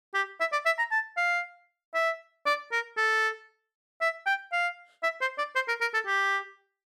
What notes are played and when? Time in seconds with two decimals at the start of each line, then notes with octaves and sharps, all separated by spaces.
0.14 G4
0.40 E5
0.53 D5
0.66 E5
0.79 A#5
0.91 A5
1.17 F5
1.95 E5
2.46 D5
2.72 A#4
2.97 A4
4.01 E5
4.26 G5
4.52 F5
5.03 E5
5.21 C5
5.38 D5
5.55 C5
5.68 A#4
5.81 A#4
5.94 A4
6.07 G4